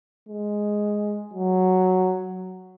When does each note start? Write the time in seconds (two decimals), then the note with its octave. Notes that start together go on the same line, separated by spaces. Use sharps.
0.28 G#3
1.33 F#3